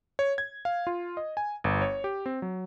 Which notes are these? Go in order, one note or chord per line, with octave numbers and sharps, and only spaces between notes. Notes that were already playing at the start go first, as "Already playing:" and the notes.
C#5
G#6
F5
F4
D#5
G#5
G1
C#5
G4
C4
F#3